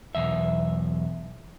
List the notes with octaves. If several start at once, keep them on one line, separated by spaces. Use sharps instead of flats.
B1 E2 E5